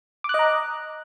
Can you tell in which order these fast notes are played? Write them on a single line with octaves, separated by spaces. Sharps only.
D6 F#6 D#5 A#5